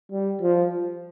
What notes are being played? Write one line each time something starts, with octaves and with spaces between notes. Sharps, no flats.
G3
F3